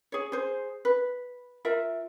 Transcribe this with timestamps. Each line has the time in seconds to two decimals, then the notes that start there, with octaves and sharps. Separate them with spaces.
0.12 G#4 C#5
0.32 G#4 C5
0.85 B4
1.65 F4 A#4 E5